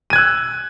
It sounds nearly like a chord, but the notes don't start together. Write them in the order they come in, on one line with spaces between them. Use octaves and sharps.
D#7 G#6 F#6 E6